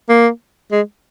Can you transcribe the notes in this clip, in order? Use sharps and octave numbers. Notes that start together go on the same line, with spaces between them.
A#3
G#3